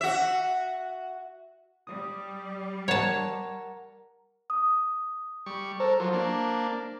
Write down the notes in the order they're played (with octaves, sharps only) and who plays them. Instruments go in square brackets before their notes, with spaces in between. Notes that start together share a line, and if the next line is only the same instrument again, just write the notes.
[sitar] F#4 E5
[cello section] G3 [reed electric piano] D#6
[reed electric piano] A#4 F#5 A#5 [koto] C#5 A5
[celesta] D#6
[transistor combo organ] G3 C#6
[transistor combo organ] A4 A#4 [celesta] C5
[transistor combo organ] F3 F#3
A#3 D4